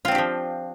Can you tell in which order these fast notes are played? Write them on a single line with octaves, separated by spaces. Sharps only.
F4 C4 D4 G4 F3